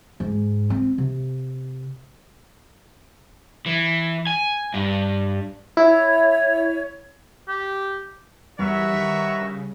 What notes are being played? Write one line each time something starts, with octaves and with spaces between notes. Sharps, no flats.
G#2
C4
C3
E3
G#5
G2
E4 C#5 E5
G4
E2 G3 F#4 A#4 B4 C#5 E5 C#6
D#3
C#3